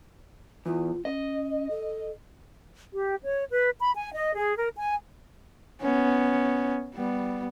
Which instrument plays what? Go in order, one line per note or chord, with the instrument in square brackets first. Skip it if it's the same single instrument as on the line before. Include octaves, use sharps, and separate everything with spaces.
[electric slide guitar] E2 [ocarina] F4
[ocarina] C#4 [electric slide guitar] D#5
[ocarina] A4
[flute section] G4
C#5
B4
B5
G#5
D#5
G#4
A#4
G#5
[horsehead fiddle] B3 C#4
G3 B3